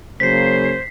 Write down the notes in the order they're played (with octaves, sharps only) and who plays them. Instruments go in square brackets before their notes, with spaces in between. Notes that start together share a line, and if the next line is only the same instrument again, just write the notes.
[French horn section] C#3 F#3 A#3 [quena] C5 [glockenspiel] B6 C7